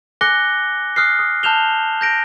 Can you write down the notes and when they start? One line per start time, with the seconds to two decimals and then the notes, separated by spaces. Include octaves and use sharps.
0.21 G#5 D6 F#6 A#6 C#7 G7
0.96 D#6 F6 F#6 C7
1.19 D#6
1.43 A5 F6 G6 E7 F7 G7
2.01 G6 A#6 D7